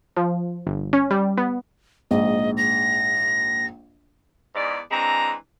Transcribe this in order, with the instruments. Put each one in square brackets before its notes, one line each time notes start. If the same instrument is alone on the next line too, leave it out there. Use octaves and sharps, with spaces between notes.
[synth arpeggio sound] F3
G1
C#4
G3
B3
[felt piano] A#1 G#2 [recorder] D#5
[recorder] A#6
[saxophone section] E2 G#2 D5
[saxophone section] E3 G#3 C4 [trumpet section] D4 A#5